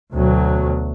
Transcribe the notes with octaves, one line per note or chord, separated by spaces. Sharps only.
D2 B2 F#3